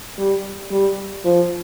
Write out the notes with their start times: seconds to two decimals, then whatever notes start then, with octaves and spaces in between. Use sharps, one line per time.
0.18 G3
0.71 G3
1.25 F3